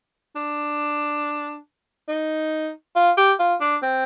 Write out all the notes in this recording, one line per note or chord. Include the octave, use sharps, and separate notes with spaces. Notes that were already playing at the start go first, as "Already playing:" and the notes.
D4
D#4
F4
G4
F4
D4
C4